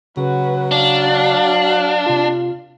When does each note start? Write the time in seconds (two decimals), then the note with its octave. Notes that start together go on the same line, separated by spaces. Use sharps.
0.17 C#3 F#3 F#4 B4
0.71 D4 F5
2.06 C3 F4